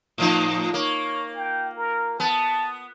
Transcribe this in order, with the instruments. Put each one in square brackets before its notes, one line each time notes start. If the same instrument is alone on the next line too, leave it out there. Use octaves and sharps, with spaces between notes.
[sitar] A2 F3 D#4
[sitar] A#3 [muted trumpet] C#5
[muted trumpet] G5
A#4
[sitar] B3 [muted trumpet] A5